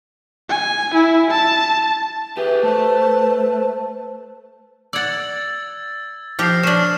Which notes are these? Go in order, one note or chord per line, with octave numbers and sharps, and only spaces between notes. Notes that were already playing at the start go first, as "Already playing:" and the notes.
G#5
E4
A5
G4 G#4 B4 E5
A3 C5 A5
D5 F#5 E6 G#6 A6
F3 G4 F6 A#6 C7
C#4 D4 E7